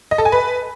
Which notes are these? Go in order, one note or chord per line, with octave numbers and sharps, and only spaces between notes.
D#5
A4
G#5
B4